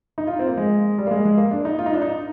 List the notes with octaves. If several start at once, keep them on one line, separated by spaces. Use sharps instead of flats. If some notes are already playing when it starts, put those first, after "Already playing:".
D#4
F4
C4
A#3
G#3
G3
A#3
G#3
G#3
A#3
D4
D#4
F4
D#4
D4
D#4